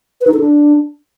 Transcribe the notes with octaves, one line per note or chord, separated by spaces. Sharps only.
B4
D#4
A4
D4